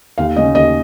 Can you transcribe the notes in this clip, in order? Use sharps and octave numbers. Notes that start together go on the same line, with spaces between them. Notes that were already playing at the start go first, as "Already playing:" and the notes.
D#2 F5
C#3 A3 C#4 D#5
D#2 D#5